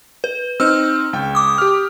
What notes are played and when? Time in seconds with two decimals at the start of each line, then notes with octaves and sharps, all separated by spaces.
0.24 B4
0.60 C4 D#4 E6 F6
1.13 C#2 G5
1.35 D6 D#6
1.58 G4 F6